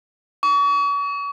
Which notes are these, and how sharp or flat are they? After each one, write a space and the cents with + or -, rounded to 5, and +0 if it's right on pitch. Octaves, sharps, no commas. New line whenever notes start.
C#6 +40